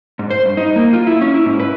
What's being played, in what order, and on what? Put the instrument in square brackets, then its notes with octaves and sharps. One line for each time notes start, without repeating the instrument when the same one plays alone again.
[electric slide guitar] G#2
C5
G2
D#4
A#3
F4
E4
C#4
E4
G#2
B4